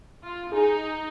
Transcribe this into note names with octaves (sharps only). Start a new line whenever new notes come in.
F4
D#4 G#4